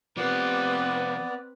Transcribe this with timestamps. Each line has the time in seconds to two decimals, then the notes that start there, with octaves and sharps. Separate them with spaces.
0.17 F3 B3 C4 G4 B4 D5